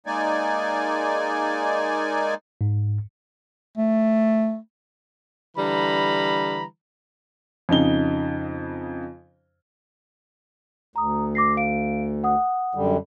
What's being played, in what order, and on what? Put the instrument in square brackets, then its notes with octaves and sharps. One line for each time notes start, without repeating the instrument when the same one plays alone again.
[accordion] G#3 A#3 D#4 D5 G#5
[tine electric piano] G#2
[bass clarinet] A3
[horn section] D3 E3 G3 A#5 B5
[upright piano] F2 C#3 D#4 G7
[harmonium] D2 [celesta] A#5 D#6
[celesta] D6 A#6 C7
F5 D7
F#5 D#6
[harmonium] F#2 D3 G3